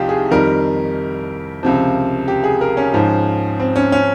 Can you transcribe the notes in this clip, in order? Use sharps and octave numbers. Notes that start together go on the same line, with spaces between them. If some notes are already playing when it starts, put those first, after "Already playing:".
Already playing: C2 F3 D#4 F4 G4
G#4
F2 D#3 G3 A#4
C#2 C3 F3
G4
G#4
A#4
C#4
G#2 F3
C4
C#4
C#4